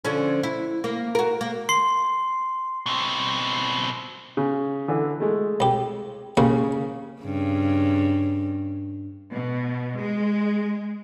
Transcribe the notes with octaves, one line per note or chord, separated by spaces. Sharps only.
D3 F3 C#4
E4
A#3
F#4 A#4
A#3
C6 C7
B2 C4
C#3
D3 E3
G#3 A3
C2 G4
C2 C#3 A#3 C#6
G2 C#3
B2
G#3